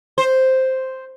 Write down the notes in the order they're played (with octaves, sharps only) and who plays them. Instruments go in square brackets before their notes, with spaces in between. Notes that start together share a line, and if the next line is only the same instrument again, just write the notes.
[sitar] C5